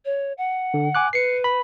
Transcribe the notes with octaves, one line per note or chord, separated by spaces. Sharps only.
C#5
F#5
D3
G#5 D6 F#6
B4 C7 C#7
B5